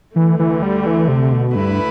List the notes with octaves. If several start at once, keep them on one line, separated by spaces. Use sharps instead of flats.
D2 D3 E3 A3
E3
G3
E3
C3
B2
D2 G2 D3 A3 E4 B4